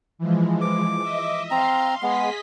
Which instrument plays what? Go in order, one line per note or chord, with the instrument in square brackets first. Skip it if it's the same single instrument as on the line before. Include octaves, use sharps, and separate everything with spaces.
[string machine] E3 F3 G#3
[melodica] D6
[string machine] D#5 E5
[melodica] C4 A#5 [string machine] F5 C6
[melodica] G#3 B3 [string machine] G#4 D#5 B6